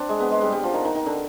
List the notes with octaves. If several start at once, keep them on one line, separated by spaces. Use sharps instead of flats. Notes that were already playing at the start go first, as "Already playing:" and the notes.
Already playing: C4 D4
G#3
B3
G#3
G3
G3
F3
D#3
D#3
D#3
D3